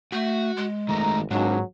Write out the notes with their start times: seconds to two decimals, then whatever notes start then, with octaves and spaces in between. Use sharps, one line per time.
0.12 A3 F#4
0.57 G#3
0.89 G#1 D#3 A3 A#5
1.30 G#1 C#2 G#2 F#3 D4